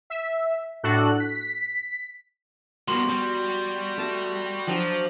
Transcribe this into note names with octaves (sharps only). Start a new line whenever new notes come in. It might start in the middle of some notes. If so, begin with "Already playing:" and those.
E5
A2 D4 F#4 A4 F#6
B6
G3 A#3 B3 F#4 A#4 C6
G3
A3 A5
F3 F#3 D4 C5